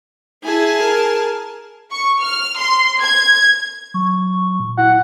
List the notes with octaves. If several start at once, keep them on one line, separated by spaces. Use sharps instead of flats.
E4 G#4 G#5 A5
A#4
C#6
F6
C6
G#6
F#3 C#6
A#2
E4 F#5